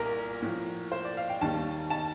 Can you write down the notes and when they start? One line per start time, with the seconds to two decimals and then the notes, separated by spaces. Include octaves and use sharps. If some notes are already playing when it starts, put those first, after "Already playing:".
Already playing: C2 A#2 A#4
0.42 A2 F3
0.92 C5
1.05 D5
1.17 F5
1.30 G5
1.41 D#2 D#3 G3 A5
1.90 A5